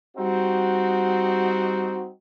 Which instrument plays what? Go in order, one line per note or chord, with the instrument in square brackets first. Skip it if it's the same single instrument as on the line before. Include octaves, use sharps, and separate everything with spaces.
[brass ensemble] G3 C4 D#4 F#4